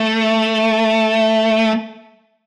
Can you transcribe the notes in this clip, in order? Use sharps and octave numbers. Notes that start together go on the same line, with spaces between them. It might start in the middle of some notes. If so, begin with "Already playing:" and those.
Already playing: A3